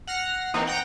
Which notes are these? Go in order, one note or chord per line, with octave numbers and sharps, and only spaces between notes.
F#5 F6 A#6 C7
E3 A#3 C4 D#4
F#5 G5 A#5 G6 A#6